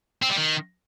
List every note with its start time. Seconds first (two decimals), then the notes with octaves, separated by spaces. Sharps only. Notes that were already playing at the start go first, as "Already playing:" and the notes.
0.22 C4
0.30 G3
0.37 D#3